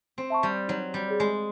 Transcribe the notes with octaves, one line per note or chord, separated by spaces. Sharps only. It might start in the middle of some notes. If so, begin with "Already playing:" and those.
C4
E5 A5 C#6
G3
F#3 D#4
G3
G#4 C#5
G#3